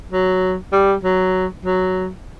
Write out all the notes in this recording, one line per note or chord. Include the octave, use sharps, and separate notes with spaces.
F#3
G3
F#3
F#3